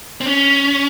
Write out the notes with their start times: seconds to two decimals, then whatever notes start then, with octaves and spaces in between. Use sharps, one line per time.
0.21 C4
0.26 C#4